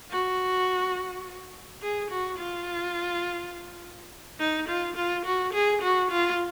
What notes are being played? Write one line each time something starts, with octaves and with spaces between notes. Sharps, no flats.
F#4
G#4
F#4
F4
D#4
F4
F4
F#4
G#4
F#4
F4